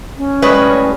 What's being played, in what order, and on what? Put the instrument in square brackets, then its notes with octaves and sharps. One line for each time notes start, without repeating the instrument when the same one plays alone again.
[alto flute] C#4
[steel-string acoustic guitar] A2 G3 G#3 [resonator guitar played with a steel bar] B4 D#5 [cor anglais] C#5